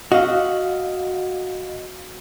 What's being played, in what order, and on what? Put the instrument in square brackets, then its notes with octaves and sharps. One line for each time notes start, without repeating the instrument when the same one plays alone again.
[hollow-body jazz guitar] F#4 [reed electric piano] D#5 F5